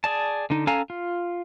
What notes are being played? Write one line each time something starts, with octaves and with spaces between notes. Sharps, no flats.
G#4 D5 A5
D3 D#4
C#4 A4 F5 G#5 A#5
F4